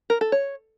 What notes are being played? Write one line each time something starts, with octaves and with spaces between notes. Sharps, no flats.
A#4
A4
C#5